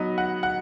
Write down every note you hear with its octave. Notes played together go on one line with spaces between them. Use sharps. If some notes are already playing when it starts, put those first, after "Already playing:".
Already playing: F#3 B3 D#4 D#5
F#5
F#5